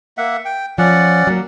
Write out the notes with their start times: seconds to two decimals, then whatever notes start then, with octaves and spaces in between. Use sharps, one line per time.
0.18 A#3 E5 F#5
0.45 G5
0.78 F3 C#4 D5 F#5
1.27 F#3 A#3